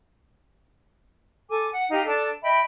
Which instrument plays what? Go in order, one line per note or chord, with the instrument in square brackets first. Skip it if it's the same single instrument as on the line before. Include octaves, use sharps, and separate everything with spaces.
[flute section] A4 G#5 D6
F#5
D#4 G4 F5
D4 A4 A5
D#5 E5 G5 B5